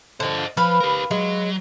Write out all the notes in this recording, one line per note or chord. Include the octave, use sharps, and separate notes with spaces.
D3 F3 C5 D#5
F3 B4 F5 B5
G4 A#4
F#3 G#3